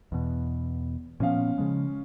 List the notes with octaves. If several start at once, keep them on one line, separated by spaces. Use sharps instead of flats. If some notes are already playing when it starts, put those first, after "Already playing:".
E2 B2
A#2 F3 B3 C#4 F5
C#3 F3 G#3